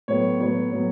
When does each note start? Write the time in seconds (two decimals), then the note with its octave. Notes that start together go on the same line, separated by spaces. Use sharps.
0.08 A2 F#3 B3 C#5
0.39 A2 F#3 B3 C#5
0.71 A2 F#3 B3